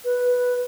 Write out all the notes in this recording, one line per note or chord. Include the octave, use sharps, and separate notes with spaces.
B4